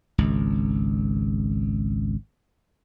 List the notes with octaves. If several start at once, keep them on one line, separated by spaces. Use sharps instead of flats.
G#1 C#2